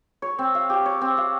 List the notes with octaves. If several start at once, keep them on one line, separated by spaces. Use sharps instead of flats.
C#5
C4
F5
G4
C#5
C4
F5